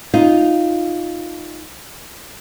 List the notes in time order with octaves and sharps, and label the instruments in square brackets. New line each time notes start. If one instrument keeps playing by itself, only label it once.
[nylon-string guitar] D#4 F4